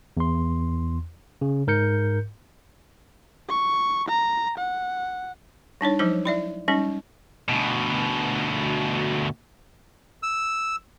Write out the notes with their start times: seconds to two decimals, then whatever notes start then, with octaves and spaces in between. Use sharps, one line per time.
0.17 E2 C6
1.41 C#3
1.67 G#2 A#4 G6 C#7
3.49 C#6
4.09 A#5
4.58 F#5
5.81 G3 D4 D#4 C#5
5.99 F3 F#3 G#3 D#4 C5
6.25 E4 D5 E5
6.68 G3 G#3 C#4 D#4
7.49 D2 B2
10.23 E6